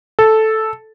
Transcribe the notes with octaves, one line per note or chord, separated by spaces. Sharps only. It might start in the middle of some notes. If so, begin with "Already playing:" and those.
A4